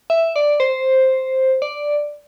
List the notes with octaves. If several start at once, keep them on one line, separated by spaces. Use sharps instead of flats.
E5
D5
C5
D5